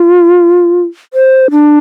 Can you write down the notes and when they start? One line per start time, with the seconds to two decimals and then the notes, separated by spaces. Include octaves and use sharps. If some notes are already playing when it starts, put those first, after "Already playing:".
Already playing: F4
1.14 C5
1.51 D4